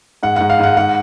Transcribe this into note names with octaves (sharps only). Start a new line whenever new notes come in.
G#2 F#5
G#2 F#5
F5
G#2 F#5
G#2 F#5